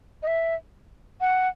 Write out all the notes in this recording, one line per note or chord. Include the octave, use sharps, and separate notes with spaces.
D#5
E5
F#5